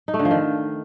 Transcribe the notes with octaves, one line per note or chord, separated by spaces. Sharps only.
D#4
A3
D3
F3
D#3